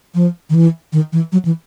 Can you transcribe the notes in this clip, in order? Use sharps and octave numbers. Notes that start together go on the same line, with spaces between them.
F3
D#3
E3
D#3
E3
F#3
E3